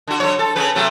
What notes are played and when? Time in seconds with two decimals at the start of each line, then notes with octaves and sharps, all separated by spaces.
0.07 D3 F#4
0.20 D3 F#3 C#5
0.39 A4
0.56 C#3 C#4 B4
0.75 C3 F#3 A3